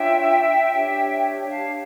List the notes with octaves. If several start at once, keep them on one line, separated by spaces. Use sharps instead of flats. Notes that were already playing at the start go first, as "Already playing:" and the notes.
Already playing: D4 F4 C#5 E5 G5
D4 G4 C#5
F5 A5